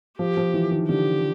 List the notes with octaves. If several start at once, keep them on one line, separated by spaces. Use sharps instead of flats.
F3 G4
F3
E3
D#3
D3 G4